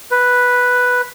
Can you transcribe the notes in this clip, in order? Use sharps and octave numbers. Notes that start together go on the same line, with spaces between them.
B4